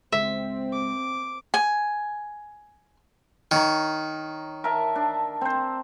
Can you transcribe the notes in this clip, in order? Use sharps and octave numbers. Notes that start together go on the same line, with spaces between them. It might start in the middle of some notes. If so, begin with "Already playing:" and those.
C#2 G#3 C4 E5
D6
G#5
D#3 C#5 A#5
A#4 E5 A5
D4
C4 C5